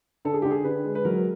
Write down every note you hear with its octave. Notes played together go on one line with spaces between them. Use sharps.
D3 A4
G#4
D3 G4
G#4
D3 B4
G#3
B4
F#3 A#4